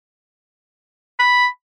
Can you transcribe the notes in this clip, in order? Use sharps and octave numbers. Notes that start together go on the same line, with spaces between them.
B5